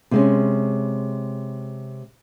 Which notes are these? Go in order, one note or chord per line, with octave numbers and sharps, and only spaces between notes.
C3 G#3 C#4